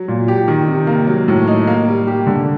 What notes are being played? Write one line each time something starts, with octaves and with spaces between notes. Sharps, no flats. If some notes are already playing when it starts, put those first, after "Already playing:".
Already playing: F#3
A#2
G4
D#3
C3
A#3
F#3
A2
D#4
A#3
G3
G4
D3